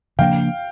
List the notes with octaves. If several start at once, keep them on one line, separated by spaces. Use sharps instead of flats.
C#3 F3 A#3 D4 F5 G5